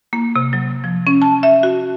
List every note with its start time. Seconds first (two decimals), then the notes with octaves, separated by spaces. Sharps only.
0.13 A#3
0.36 C3
0.53 F#3
0.84 F3
1.07 C#4
1.22 A5
1.43 E5
1.63 F#4